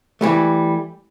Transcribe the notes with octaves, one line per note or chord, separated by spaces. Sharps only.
E3 G3 A3